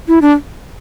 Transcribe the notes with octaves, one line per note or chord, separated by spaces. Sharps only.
E4
D4